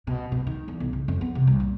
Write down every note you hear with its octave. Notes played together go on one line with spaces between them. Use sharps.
B2
B2
D#3
E2
B1
C#3
F2
B3
C3
C2
A#2